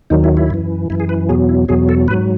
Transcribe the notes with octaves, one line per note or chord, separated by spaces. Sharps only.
D#2 D#3 F#3 D#4
E4
E4
F#2 E3
F#2 E3 E4
G#4
B4
E2 B2 F#3 G#4
E4
E2 B2 F#3 G#4
A4
G#2 F#3 B4